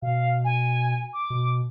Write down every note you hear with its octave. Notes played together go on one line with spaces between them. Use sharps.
B2 F5
G#5
D6
B2